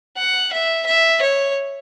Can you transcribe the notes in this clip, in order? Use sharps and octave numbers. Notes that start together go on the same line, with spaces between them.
F#5
E5
E5
C#5